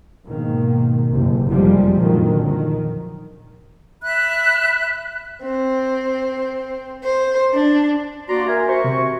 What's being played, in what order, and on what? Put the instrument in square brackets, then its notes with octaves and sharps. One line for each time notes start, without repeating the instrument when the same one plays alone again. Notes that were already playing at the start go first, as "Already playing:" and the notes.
[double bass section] G#2 B2 D#3 A#3
F#1 A2 C3
F2 C3 D#3 F3 G3 G#3
F2 A#2 D3 D#3 F3 F#3
D#3
[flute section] E5 B5 F#6
[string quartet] C4
C5
D4
[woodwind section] A#3 D5 C6 [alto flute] F#4 [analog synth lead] A#5
[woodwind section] A#4 G#5 [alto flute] E5
[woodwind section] F#4 C#6 [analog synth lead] C5
[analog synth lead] C3